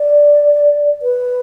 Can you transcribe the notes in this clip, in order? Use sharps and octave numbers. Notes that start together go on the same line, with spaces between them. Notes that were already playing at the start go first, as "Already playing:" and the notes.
Already playing: D5
B4